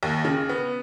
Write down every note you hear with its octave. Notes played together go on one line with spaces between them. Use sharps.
D#2
C#3
B3